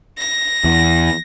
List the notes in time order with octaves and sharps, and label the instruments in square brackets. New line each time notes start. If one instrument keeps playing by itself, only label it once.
[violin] A#6
[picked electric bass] E2